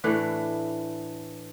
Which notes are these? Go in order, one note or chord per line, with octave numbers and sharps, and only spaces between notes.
A2 E3 A3 D4